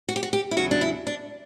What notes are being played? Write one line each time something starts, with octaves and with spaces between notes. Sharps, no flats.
F#4
G4
F#4
G4
E4
E2 C#3 F#3 F#4
D4
E4
D4